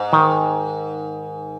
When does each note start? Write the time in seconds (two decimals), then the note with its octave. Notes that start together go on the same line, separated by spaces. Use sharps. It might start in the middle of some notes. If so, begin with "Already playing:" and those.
Already playing: G#2
0.13 D#3